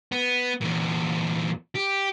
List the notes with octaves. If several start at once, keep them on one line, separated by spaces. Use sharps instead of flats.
B3
E2 A#2
G4